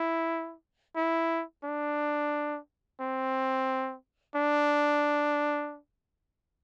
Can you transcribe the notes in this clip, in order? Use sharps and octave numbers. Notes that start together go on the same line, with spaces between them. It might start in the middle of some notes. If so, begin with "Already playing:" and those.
Already playing: E4
E4
D4
C4
D4